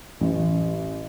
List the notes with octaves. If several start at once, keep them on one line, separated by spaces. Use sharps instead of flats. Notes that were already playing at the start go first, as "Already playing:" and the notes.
A1